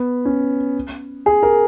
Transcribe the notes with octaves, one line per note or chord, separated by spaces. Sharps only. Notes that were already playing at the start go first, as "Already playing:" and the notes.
Already playing: B3
C#4
G#4
A#4